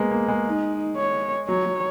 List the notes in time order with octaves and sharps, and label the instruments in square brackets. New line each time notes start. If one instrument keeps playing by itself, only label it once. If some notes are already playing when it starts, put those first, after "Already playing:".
Already playing: [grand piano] G#3 A#3 B3
A#3
G#3
[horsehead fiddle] D#4
C#5
[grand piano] F#3 [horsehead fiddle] C#5
[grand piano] F#3